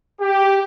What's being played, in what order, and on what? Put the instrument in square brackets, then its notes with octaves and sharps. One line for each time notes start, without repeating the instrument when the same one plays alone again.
[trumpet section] G4